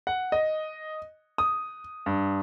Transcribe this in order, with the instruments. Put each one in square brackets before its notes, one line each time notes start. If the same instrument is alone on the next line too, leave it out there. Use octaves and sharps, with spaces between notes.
[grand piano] F#5
D#5
D#6
G2